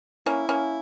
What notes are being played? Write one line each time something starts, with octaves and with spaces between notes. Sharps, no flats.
A#3 C#4 E4
A#3 C#4